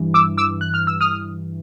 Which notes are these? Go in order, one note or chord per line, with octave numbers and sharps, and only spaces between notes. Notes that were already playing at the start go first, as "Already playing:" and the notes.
Already playing: G2 E3
D6 E6
D6 E6
F#6
F6
E6
D#6 F6